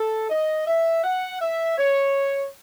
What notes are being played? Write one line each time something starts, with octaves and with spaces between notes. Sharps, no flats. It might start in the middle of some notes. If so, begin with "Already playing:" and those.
Already playing: A4
D#5
E5
F#5
E5
C#5